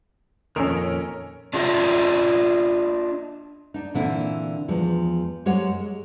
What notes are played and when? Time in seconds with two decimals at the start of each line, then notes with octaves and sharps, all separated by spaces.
0.56 F2 A#2 D#3 C#4 A4 A#4
1.53 D4 F4 F#4 A4 D#5 E5
3.74 D4 D#4
3.94 A#2 D3 E3 C4 D4 E4
4.68 E2 F3 G#3
5.46 F#2 G#3 G4 C5 C#5 F#5
5.80 G#3